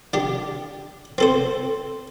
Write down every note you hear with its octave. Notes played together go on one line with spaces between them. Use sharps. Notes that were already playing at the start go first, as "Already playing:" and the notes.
D4 G4
C4 A4 C5